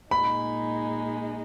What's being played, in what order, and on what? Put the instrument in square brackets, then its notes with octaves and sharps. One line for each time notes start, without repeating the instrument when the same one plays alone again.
[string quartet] A#2 G#3 D#4 [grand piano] B5